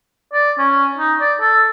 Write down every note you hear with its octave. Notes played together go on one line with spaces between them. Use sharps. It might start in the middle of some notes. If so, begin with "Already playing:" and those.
D5
C#4
D#4
D5
A4